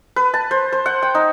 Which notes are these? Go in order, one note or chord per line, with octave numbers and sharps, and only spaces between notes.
B4
A5
C5
C5
F#5
G5
D#4